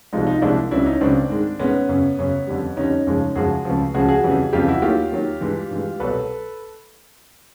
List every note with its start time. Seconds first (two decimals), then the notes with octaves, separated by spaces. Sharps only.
0.13 C2 C3 F3 G#3 D#4 F4
0.27 D#4 F4
0.42 C2 C3 F3 G#3 D4 E4
0.71 C#2 C#3 F#3 D4 E4
0.86 C#4 D#4
1.01 C#2 C#3 F#3 C4 D4
1.30 G#2 D#3 G#3
1.59 G#2 D#3 G#3 B3 C#4
1.89 F#2 C#3 F#3
2.18 F#2 C#3 F#3
2.47 F2 D3 G3
2.76 F2 D3 G3 C#4 D#4
3.07 F#2 C#3 F3 G#3
3.36 F#2 C#3 F3 G#3 F#4 G#4
3.65 C#2 C#3 F3
3.94 C#2 C#3 F3 F#4 G#4
4.09 F#4 G#4
4.23 F2 C#3 E3 G3
4.53 F2 C#3 E3 G3 F4 G4
4.68 E4 F#4
4.82 D#2 D#3 F#3 F4 G4
5.12 D#2 D#3 F#3
5.41 G2 E3 G#3
5.71 G2 E3 G#3
6.00 C2 B2 F#3 A4 B4